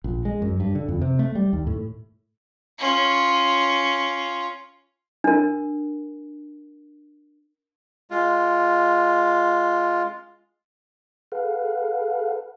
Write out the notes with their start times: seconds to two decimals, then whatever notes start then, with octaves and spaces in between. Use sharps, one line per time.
0.04 A#1
0.25 G#3
0.42 F#2
0.60 G2
0.75 D3
0.88 F2
1.02 C3
1.19 A3
1.35 G3
1.53 D#2
1.67 A2
2.79 C#4 F4
5.24 D4 A#4
8.11 G#3 F4
11.32 G#4 A4 B4 F5 F#5